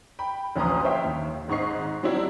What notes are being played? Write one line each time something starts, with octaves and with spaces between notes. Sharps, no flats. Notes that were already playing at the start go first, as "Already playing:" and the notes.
G5 B5
A1 D2 F3 A#5 C6 D#6
C5 C#5 E5 F5 G5
D#2
G#1 G#2 D#4 C#6 C7
D3 F#3 G3 C4 D4 E4